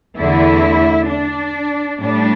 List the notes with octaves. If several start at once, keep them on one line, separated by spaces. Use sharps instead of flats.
E2 D3 A3 E4
D4
A2 G3 D4